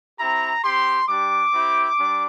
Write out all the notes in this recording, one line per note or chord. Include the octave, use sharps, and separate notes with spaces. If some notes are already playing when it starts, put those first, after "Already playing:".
C4 E4 G4 A#5
C4 G4 C6
G3 D4 G4 D6
C4 E4 G4
G3 D4